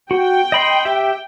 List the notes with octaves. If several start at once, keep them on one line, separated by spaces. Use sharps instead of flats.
F#4 G5
D#5 B5 C6
G4 E5